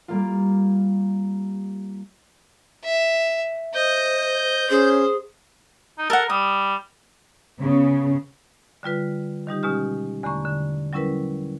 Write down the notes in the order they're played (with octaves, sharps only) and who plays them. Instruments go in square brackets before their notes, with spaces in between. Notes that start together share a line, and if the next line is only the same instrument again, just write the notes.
[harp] G3 A#3 F4
[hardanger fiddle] E5
[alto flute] C5 [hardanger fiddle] D#5 [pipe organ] G6
[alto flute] C#4 [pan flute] G#4 [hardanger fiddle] C5
[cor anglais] D#4
[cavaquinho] A4 F#5 [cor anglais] A#4
[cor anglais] G3 [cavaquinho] D#6
[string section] C#3 B3
[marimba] D3 G3 F4 B4
D#3 G3 D#4 G4
B2 G#3 C#4 G4 F6
E2 D3 A3 A#5 C#6
D3
F#3 G3 C#4 E4 A#4 B4